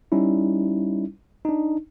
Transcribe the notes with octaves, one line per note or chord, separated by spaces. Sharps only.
G3 C#4 D#4 E4
D4 D#4